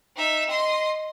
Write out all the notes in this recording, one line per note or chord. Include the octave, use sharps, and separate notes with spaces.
D#4 E5
D#5 C6